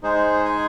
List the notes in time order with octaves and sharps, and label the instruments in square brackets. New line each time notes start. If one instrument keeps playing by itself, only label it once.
[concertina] G#3 D#4 G#4 C5
G#5